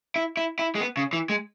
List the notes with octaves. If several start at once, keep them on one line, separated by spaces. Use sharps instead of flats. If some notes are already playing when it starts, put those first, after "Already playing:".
E4
E4
E4
G#3
B3
C#3
E3
G#3